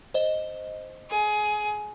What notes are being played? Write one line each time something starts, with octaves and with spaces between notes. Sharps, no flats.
C5 D#5
G#4